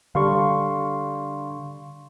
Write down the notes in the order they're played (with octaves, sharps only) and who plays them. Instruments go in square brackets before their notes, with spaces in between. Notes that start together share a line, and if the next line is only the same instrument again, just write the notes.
[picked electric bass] D3 [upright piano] G3 [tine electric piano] F5 C6 C#6